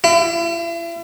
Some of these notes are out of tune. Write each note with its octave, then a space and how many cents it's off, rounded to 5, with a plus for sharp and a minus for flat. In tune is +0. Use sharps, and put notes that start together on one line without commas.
E4 +40